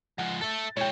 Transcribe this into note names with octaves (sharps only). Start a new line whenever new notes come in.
F3 G#3 F#5
A4 E5 A6
G#3 E4 C#5 G5